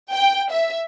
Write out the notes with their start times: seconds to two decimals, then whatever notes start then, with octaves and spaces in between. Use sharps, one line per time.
0.12 G5
0.51 E5